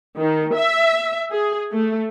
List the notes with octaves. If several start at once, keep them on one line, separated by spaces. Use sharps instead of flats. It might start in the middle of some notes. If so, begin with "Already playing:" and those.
D#3
E5
G#4
A3